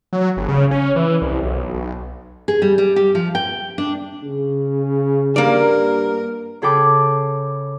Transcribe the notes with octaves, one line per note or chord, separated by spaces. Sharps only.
F#3
G1
C#3
C#4
E3
C2
B1
B1
G#4
G3
G3
G4
F3
G5
D4
C#3
G2 A#3 A#4 D5
C#3 G#4 A4 G5 B5 D6